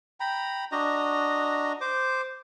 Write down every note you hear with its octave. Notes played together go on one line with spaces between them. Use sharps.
G5 A#5 B5
D4 F#4 D#5 A#5
C5 D6